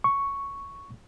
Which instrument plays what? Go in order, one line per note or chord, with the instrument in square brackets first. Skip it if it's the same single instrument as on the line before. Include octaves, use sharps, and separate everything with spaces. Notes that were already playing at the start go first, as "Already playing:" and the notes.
[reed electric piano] C#6